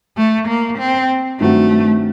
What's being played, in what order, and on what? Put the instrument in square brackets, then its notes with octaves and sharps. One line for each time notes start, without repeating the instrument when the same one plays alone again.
[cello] A3
A#3
C4
[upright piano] G2 D#3 F#3 C4 F#4 [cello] A3